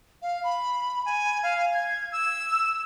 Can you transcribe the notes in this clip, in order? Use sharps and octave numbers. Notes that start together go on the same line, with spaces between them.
F5
B5
G#5
F5
G#6
E6